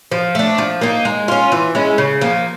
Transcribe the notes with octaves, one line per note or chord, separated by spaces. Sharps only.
F3
A3 D4
F3
A#3 D#4
G#3
C#4 F4
E3
G#3 C#4 E4
C#3
F3 A#3